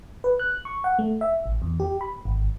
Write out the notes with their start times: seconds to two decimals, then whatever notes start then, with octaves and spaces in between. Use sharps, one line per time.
0.24 B4
0.39 F#6
0.65 C#6
0.84 F#5
0.99 A3
1.21 E5
1.46 A1
1.62 E2
1.80 G4
2.01 B5
2.25 G#1